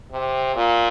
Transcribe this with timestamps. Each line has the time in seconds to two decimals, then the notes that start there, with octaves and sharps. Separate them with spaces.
0.12 C3
0.55 A#2